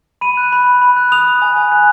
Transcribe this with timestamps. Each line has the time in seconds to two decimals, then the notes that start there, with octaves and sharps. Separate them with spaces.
0.21 B5 D#7
0.37 F#6
0.52 B5
0.67 B5
0.82 B5
0.97 F#6
1.12 D#6 F7
1.27 D#6
1.42 G#5
1.56 G#5
1.72 F#6